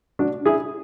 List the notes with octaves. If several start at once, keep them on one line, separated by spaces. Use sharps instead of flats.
D4 F#4
E4 G#4